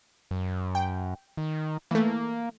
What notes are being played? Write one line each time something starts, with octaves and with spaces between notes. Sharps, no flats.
F#2
G5
D#3
E3 A3 A#3